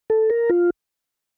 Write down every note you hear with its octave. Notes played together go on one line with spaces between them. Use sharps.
A4
A#4
F4